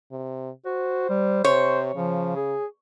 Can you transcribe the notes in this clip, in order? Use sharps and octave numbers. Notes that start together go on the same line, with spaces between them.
C3
F#4 C5
G3
C3 C5 C#5
C#3 F3
G#4